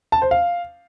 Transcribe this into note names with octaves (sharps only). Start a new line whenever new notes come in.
A5
C5
F5